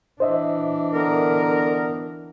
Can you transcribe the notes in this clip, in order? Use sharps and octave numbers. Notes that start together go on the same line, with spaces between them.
E3 D4 C5 D#5 E5
D3 B3 A#4